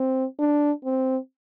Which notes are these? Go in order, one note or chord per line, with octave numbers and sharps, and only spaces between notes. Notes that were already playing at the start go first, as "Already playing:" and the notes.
Already playing: C4
D4
C4